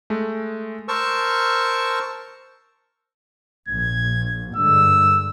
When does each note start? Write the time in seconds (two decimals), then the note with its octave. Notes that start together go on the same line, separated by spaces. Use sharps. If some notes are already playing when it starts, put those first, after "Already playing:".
0.10 G#3 A3
0.88 A#4 C5 A5 C#6 E6
3.68 A#1 G#6
4.56 G2 D3 G#3 E6